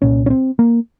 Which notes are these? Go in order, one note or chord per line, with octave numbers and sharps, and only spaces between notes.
C2 A#2 C#4
C#4
C4
A#3